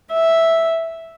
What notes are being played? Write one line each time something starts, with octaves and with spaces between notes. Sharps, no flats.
E5